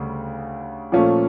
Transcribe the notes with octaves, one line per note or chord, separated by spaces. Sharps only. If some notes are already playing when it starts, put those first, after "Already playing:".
Already playing: D2 C#3 G3
A#2 F3 A3 C#4 F4